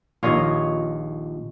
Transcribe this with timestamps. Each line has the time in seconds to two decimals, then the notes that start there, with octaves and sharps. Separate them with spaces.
0.23 A#1 D#2 F4 C#5 D#5